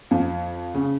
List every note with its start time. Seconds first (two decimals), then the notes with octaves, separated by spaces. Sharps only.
0.11 F2
0.74 C#3